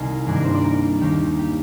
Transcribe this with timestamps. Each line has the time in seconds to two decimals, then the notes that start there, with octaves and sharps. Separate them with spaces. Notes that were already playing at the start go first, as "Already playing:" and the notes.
Already playing: C2 C3 D#3 G#4 A#4 D5
0.26 G2 D#3 A#3 D4 G#4
0.35 A#4
0.45 C5
0.54 D5
0.64 A#4
1.00 D#2 D#3 A#3 D#4 G4
1.39 G4